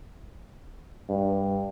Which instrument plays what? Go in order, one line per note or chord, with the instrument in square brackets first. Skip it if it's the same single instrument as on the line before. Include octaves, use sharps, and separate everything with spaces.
[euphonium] G2